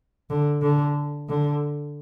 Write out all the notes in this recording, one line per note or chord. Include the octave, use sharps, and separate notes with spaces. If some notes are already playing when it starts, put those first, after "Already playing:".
D3
D3
D3